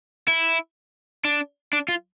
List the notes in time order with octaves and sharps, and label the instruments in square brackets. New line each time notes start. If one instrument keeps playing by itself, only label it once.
[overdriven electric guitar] E4
D4
D4
F4